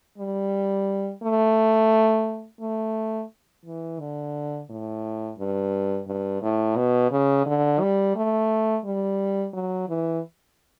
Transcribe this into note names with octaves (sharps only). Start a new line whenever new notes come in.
G3
A3
A3
E3
D3
A2
G2
G2
A2
B2
C#3
D3
G3
A3
G3
F#3
E3